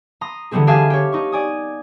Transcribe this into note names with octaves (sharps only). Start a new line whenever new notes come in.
A#5 C6 D#6
D3 E3 G3 B3 C4 G#4
G4 G#4 E5 F5 G#5 A5
G4 C#5
D#4 C#6
D5 G#5 D#6